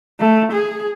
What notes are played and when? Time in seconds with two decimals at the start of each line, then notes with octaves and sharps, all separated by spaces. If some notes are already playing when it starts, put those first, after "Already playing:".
0.20 A3
0.52 G#4